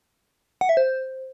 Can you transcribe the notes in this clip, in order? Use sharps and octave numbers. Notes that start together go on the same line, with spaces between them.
F#5
E5
C5